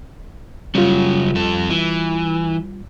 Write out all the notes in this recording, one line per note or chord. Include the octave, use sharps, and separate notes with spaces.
C#3 F#3 G3 C#4 F4
F2 A4
E3